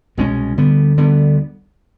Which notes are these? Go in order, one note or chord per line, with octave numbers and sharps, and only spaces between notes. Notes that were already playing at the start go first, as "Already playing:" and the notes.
C2 B2 G#3 C#4
D2 D3 G3 B3
D2 D3 G3 B3